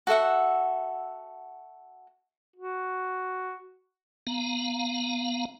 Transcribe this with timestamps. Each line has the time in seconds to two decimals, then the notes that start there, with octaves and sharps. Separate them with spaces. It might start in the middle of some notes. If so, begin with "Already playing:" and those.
0.07 F#4 A4 E5 F#5
2.56 F#4
4.27 B3 F5 A#5